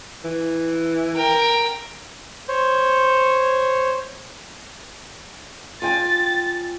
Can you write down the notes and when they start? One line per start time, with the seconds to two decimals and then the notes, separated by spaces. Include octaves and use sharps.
0.24 E3
1.16 A#4 G5
2.48 C5 C#5
5.82 F4 G5 G#5 A6